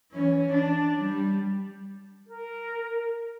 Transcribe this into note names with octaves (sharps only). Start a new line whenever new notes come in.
E3 C#4
D4
G3
A#4